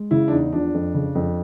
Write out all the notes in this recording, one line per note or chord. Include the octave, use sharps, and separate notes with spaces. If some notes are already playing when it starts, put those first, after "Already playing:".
Already playing: G#3
C#3 E4
D4
E2 D#4
F3 D4
F2
C#3
F2